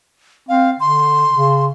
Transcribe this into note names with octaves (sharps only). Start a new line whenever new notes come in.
C4 F5
D3 C6
C#3